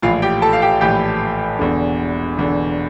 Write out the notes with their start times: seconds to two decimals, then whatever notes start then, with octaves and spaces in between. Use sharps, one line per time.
0.02 A#1 A2 E3 F4 F5
0.22 G4 G5
0.42 A4 A5
0.53 F5
0.62 G4 G5
0.81 A#1 A2 E3 G4 G5
1.59 E1 E2 D3
2.37 E1 E2 D3